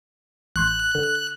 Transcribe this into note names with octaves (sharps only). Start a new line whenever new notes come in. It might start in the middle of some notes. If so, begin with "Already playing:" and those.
A1 C6 F#6 G6
D3